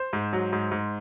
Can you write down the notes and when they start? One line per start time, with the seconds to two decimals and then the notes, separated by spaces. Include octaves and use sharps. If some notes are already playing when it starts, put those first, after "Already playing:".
Already playing: C5
0.13 G#2
0.33 F#3
0.53 G#2
0.71 G#2